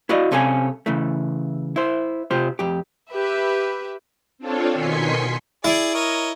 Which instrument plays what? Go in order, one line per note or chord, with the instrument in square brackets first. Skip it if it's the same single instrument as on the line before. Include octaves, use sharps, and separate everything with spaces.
[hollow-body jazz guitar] E4 F#4 D5 D#5 F5
C2 C3 C#4 A4 F5 G#5
C#3 E3 A3
E4 C5
C3 F4 G4 C5
F2 G4
[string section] G4 B4 E5
[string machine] C4 D4 F4 A4 C#5
B2 D#3 G#5 C6 B6 C#7
[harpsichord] E4 [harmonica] G#4 D5
[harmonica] A#4 C#5 D#5